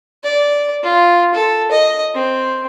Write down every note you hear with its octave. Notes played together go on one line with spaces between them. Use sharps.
D5
F4
A4
D#5
C4